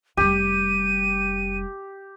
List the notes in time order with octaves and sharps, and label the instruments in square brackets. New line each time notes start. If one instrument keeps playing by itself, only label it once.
[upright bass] F1 G3 [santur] G4 [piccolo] D#7